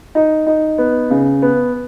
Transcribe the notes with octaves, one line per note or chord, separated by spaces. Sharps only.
D#4
D#4
B3
C#3
B3